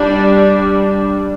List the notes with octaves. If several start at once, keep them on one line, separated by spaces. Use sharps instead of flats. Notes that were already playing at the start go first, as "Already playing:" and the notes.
Already playing: G3 D4